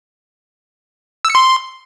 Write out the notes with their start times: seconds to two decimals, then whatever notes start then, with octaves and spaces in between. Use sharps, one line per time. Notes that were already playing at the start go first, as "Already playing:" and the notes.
1.25 E6
1.30 C#7
1.35 C6